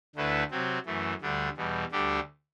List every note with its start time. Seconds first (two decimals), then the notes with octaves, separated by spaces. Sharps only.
0.16 D2 D3 A3 E4 B4
0.51 C3 F#3 C4
0.86 F#2 E3 A3
1.21 D2 D3 G3 D4
1.56 E2 B2 G3
1.91 D2 D3 G3 D4 G4